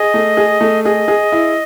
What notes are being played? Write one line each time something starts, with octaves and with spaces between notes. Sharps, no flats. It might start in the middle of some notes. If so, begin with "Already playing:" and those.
Already playing: G#4 D#5
A3
G#4
A3
G#4 D#5
G#4
E4